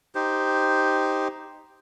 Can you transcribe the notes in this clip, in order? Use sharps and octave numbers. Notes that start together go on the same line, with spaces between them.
D#4 G4 C5